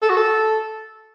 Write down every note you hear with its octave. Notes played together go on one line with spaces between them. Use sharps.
A4
F#4
A4